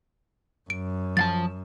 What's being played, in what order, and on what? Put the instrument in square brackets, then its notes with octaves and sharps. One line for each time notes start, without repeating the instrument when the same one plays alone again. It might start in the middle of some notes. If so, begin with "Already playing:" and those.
[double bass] F#2 [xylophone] D7
[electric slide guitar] F3 F5 A5 [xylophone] A6